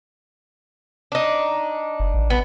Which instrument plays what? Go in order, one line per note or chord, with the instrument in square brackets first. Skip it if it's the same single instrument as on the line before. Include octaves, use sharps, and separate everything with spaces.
[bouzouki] D4 D#4
[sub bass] F#1
A1
[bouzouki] B3